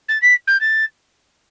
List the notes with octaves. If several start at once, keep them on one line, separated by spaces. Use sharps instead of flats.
A6
B6
G6
A6